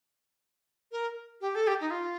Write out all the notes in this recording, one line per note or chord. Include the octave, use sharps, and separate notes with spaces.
A#4
G4
A4
G4
D#4
F4